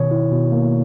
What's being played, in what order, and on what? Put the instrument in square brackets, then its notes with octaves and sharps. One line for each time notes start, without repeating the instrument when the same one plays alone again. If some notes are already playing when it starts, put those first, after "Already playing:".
Already playing: [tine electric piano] B2 D#3 C#5
E4
B2
A#3